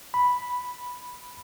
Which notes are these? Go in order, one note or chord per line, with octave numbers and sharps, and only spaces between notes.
B5